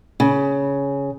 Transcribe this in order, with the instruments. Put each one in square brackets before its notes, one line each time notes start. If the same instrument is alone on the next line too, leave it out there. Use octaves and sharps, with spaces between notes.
[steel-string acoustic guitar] C#3